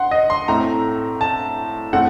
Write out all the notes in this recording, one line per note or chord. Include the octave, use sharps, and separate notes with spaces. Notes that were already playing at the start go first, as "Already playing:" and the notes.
Already playing: F#5 C6
D#5
C6
A2 A3 C4 A#5
A5
A2 A3 C4 F#5